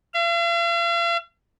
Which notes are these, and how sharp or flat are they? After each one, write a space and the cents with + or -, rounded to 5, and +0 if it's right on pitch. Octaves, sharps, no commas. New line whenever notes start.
F5 -45